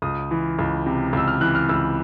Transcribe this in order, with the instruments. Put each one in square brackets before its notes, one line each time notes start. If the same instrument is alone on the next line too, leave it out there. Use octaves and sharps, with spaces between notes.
[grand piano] C#2 D#6
E3
C#2
C3
C#2 E6
F6
E3 F#6
F6
C#2 E6